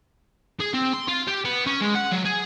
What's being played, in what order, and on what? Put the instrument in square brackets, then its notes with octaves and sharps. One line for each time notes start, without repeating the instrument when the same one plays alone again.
[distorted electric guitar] G#4
C4
C6
F4
G4
B3
C#4
G#3
F#5
F#3
G#4